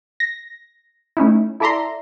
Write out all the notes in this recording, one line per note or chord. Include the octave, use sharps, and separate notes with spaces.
A#6
A3 C#4 D#4 E4
E4 A4 D5 E5 A#5 C6